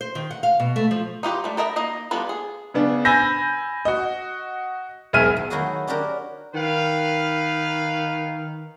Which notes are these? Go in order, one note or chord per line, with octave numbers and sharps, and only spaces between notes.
C5
D#3
F#5
F5
B2
A3
F3
D#4 F4 G4 B4
G3 A3
A4 A#4 D#5 E5 B5
A#3 D#4 D#5
G3 B3 D4 F4 A4
G#4
C#3 B3 D4
G#5 B5 E6 G6 A#6
F#4 D#5
E1 B1 G#4 E5 F6 D#7
E2
D#3 F#3 A3 E4 F#4 G#4
C#4 D4 F#4 G4 A#4
D#3 B4 F5